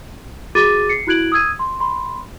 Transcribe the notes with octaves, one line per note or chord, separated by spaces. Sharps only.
F#4 G#4 D6 A6 D#7
C7 C#7
E4 F#4 F#6 G#6 D7 F#7
D#6 E6 G#6 D#7
C6
B5 C6